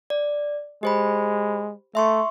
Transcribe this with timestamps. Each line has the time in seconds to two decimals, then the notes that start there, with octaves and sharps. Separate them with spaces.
0.10 D5
0.83 G#3 G4 C5 B5
1.95 A3 E5 C6 C#6